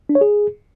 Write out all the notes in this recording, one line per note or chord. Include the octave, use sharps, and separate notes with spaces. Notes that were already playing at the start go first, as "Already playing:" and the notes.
D4
C#5
G#4